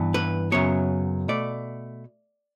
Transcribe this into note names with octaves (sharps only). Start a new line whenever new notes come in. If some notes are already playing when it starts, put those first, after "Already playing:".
Already playing: G2 E3 B3
B4
F#2 C#3 F#3 B3 C#5
B2 A3 D5